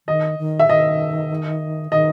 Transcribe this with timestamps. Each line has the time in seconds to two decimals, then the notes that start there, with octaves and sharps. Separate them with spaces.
0.07 D#3 D#5
0.39 D#3
0.60 E5
0.69 D#3 D#5
1.91 D#3 D#5